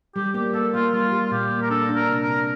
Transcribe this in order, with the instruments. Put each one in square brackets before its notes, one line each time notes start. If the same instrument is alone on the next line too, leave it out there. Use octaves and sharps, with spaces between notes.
[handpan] G3 [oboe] G4
[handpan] A#3 [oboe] G4
[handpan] A#3 [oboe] A4
[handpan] A#3 [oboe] F4
[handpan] G3 [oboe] F4
[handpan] G3
[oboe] F4
[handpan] A#2 [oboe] G4
[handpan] A#3
[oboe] A#4
[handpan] D4 [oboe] A4
[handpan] D4
[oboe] A#4
[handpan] C3
[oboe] A#4
[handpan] C3